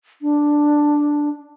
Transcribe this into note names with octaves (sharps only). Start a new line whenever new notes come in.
D4